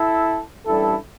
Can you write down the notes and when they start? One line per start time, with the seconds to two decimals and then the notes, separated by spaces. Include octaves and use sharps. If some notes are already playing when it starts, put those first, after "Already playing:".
Already playing: E4 A4
0.66 A1 G2 G3 E4 A4